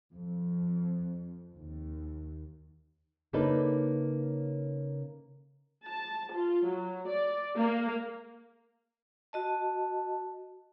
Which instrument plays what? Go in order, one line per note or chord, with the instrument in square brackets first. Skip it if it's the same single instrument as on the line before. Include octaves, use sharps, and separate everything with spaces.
[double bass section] F2
D#2
[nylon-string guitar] C#3 A#3 D4 D#4 A4 B4
[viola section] A5
F4
F#3
D5
A#3
[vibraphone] F#4 D#5 A5